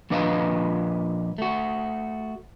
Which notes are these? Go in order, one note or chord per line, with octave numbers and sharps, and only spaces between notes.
A#2 F3 D4 B4 D#5 F5
A3 F#4